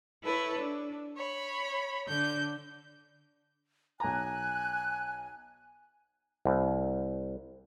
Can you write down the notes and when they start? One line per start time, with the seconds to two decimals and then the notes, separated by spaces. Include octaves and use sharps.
0.23 E4 A4 B4 C#5
0.59 D4
1.16 C#5 B5
2.07 D3 G6
4.00 B1 G#5 A#5 F#6
6.45 C2